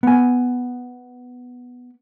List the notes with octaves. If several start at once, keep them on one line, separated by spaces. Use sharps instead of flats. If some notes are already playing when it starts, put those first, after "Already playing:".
B3 G#5